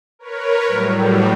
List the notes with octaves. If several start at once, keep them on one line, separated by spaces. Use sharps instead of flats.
A#4 B4 C#5
A2 F#3 G3